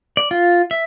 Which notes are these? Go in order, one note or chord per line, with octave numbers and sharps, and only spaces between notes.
D5
F4
E5